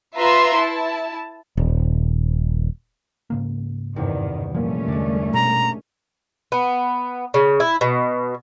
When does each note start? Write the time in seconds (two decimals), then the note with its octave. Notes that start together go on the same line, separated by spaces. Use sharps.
0.17 F4 B4 E5 A#5 C6
0.58 E4 A5
1.57 D#1
3.30 G#2 C#3 A#3
3.96 E2 G2 C3 D#3
4.54 A#2 F3 G3 A3 A#3 C#4
4.88 E2 D3 G#3 D4
5.34 B2 A#5
6.52 B3
7.34 C#3
7.60 E4
7.81 B2